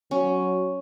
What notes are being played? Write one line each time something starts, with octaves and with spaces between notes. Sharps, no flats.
F#3 C#4